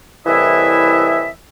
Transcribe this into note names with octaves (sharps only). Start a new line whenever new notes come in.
C2 A2 E3 E4 D#5 E5